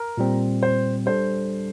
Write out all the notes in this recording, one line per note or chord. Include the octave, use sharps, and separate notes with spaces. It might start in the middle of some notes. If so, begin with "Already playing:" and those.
Already playing: A#4
A#2 G3 C4
C5
G3 D4 A4 C5